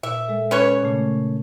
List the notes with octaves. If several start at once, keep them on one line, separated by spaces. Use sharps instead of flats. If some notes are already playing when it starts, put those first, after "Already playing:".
A#2 E5
G#3 A4
C#4 B4 C#5
A#2 C#3 A3